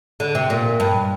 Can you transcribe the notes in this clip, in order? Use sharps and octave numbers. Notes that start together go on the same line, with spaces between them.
D3
C3
A#2
G2